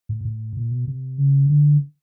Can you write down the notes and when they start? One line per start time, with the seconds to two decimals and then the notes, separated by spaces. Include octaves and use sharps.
0.09 A2
0.25 A2
0.57 A#2
0.71 B2
0.87 C3
1.18 C#3
1.49 D3